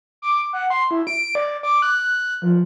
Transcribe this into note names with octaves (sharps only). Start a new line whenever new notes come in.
D6
F#5
C6
E4
D7
D5
D6
F#6
F3